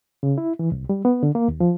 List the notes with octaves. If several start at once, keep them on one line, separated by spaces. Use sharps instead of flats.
C#3
E4
E3
C2
G3
B3
D3
A#3
D#2
F3